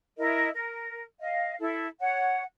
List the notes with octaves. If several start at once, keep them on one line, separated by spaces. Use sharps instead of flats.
E4 A#4 D#5
A#4
D#5 F5
E4 A4
C#5 F#5